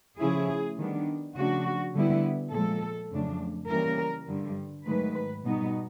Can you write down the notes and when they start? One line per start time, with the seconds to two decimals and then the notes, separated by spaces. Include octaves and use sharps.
0.19 C#3 F3 A3 C#4 E4 G#4
0.78 D#3 G3 B3 D4
1.36 C#3 F3 A3 D4 F#4
1.95 D3 G3 B3 E4
2.52 A#2 F3 G#3 A4
3.11 F2 C#3 F#3 A3 D4
3.69 C#3 E3 G3 A#3 A#4
4.28 G2 D3 G3
4.86 G#2 D#3 F#3 A3 B4
5.45 B2 G3 B3 D#4